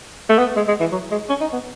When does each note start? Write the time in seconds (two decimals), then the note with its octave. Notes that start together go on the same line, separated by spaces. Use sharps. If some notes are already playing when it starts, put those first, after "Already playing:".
0.29 A3
0.38 B3
0.57 G#3
0.68 G#3
0.80 E3
0.92 F#3
1.11 G#3
1.29 C#4
1.41 D#4
1.53 B3